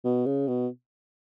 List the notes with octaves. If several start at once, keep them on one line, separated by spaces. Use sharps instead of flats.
B2
C#3
B2